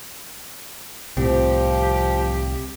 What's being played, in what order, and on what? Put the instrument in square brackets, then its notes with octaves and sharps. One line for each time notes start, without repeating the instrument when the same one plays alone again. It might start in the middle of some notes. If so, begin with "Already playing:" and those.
[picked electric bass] C2 [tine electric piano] A2 C4 [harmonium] F3 [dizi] G4